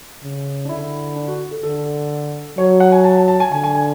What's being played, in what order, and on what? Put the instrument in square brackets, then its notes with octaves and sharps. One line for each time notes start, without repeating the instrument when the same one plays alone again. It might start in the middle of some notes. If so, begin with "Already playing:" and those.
[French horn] C#3
[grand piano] D4
[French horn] D3 [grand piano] E4
[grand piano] D4
F#4
A4
[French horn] D3 [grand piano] A4
[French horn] F#3 [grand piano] C#5
[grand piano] F#5
G#5
A5
A5
A5
G#5
[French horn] D3 [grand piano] G#5
[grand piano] G#5
G#5